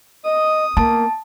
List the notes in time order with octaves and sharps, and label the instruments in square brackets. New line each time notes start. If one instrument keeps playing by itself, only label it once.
[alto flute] D#5 [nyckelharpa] D#6
[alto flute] A#3 [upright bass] B3 [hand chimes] A5